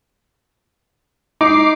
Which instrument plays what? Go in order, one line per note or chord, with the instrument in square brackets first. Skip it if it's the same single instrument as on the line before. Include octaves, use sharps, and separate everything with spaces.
[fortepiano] D#4 [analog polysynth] D6 C7